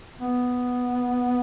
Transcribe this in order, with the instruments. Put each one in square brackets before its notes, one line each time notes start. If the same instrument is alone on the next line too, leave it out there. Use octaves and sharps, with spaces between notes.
[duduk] B3